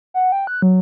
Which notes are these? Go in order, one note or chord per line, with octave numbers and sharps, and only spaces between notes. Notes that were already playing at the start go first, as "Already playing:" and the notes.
F#5
G5
F#6
F#3